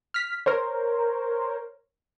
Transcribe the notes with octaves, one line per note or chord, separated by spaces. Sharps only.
F6 B6
A#4 C5 C#5